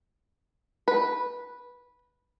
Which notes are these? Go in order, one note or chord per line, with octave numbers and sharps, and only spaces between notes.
B4